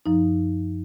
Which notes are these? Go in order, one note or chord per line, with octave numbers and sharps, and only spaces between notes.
F#2 F3 D#4